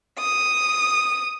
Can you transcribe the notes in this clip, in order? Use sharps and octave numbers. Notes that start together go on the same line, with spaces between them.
D#6